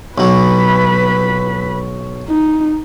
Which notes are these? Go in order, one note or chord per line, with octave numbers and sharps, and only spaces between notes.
B1 F#3 B4 B5
D#4